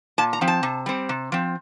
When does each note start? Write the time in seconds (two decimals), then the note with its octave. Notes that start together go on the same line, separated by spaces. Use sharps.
0.18 A#2 A5
0.33 A#5
0.41 F3 C4
0.48 A5
0.63 C3
0.86 G3 C4
1.09 C3
1.32 F3 C4